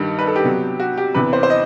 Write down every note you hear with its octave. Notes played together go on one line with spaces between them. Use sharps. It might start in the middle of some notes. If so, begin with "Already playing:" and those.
Already playing: G2 D#3 G3 D#4
B4
A4
G4
C3 F#3 B3
F#4
G4
E2 C3 E3 B4
C5
C5
D#5